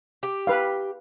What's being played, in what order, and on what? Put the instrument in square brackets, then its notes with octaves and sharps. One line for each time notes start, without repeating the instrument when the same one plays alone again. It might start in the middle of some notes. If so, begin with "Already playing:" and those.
[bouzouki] G4
[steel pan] B4 F5